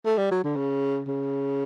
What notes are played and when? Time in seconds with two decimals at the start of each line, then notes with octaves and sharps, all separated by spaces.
0.05 A3
0.18 G3
0.31 F#3
0.44 D3
0.56 C#3
1.08 C#3